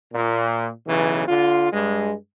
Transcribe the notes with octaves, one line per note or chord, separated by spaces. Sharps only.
A#2
B1 C#3 E3
D3 F4
G2 G#3